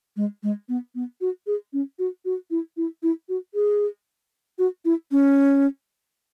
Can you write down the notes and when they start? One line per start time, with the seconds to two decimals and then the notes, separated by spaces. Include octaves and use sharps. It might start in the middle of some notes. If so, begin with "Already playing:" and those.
0.17 G#3
0.43 G#3
0.69 B3
0.95 B3
1.21 F#4
1.47 G#4
1.73 C#4
1.99 F#4
2.25 F#4
2.51 E4
2.77 E4
3.03 E4
3.29 F#4
3.54 G#4
4.59 F#4
4.85 E4
5.12 C#4